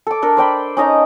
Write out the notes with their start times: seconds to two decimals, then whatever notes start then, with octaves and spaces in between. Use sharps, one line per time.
0.07 A4 D6
0.22 D4 A4 A#4
0.37 C5 D5 G5 B5
0.77 C#4 D#4 D#5 A#5